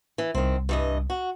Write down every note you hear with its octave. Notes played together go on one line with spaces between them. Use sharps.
E3
C2 D#3 C4
G2 E3 D#5
F#4